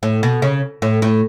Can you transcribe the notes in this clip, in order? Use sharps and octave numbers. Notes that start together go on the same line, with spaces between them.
A2
B2
C#3
A2
A2